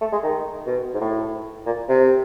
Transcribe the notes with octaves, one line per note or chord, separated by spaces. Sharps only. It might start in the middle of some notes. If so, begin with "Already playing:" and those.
A3
G#3
D#3
B2
G#2
A2
A#2
C3